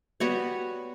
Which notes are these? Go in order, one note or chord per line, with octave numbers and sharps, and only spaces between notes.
G3 B3 F#4 C#5